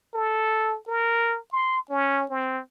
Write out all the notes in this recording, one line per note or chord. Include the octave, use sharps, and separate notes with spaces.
A4
A#4
C6
C#4
C4